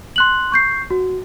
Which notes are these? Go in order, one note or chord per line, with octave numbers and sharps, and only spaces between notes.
C6 F#6 F#7
C#6 G6 C7
F#4